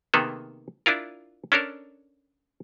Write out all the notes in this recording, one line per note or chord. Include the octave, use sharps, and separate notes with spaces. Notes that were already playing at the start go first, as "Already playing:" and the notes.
C3 D#3 A#3 B3 G#4 A4
D4 E4 F4 A#4
C#4 D4 A4 A#4